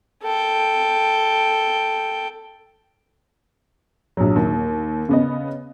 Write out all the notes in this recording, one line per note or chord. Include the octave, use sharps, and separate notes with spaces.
A4 G5
A#1 F#3
D#2
C#3 B3 D#5